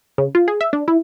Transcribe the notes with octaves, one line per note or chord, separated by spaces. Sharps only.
C#3
F4
G#4
E5
D4
E4